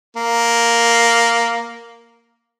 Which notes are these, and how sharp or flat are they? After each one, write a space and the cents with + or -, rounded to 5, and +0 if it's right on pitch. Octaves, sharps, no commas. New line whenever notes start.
A#3 +0